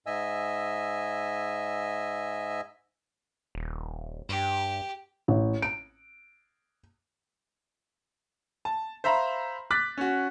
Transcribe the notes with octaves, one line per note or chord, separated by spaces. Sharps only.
G#2 D#5 E5 G#5 E6
D#1
G2 G4
A1
D7
A5
C5 E5 F5 A#5 B5
D6 F#6 A6 B6
C#4 F#4